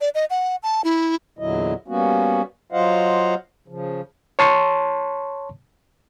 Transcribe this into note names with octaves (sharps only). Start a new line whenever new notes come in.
D5
D#5
F#5
A5
E4
E2 A#2 D3 F#3 E4 D#5
G3 A#3 B3 C#4 F#4
F#3 F4 C5 D#5 F5 F#5
C#3 F3
C#5 A5 C6 C#6